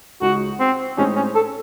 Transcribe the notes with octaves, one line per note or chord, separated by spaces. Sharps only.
C#2 C#3 G#3 D#4 F#4
C4
A2 G#3 C4 C#4 D#4
C#4
A4